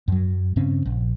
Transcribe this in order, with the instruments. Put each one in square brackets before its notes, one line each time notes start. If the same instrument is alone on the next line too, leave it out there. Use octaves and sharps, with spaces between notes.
[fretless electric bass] F#2 F#3
G2 C#3 C4 C#4
A#1